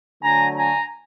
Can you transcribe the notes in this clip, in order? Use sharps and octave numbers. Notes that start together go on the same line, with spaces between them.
D3 F#3 A3 G#5 A#5
G#5 A#5